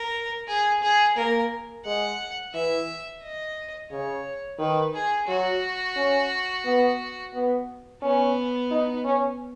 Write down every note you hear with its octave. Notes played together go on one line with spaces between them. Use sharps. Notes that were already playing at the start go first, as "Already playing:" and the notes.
Already playing: A#4
G#4
G#4
A#3 A#4
G#3 F#5
E3 E5
D#5
C#3 C#5
D#3 B4
G#4
F#3 F#4
C#4
B3
B3
B3 C#4
D#4
C#4